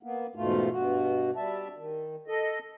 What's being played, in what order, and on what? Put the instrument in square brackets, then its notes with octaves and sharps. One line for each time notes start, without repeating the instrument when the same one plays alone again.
[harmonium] A#3 B3
E2 G#2 B2 A3 F4
G2 B2 F#4
G3 E5 A5
D#3
A4 D#5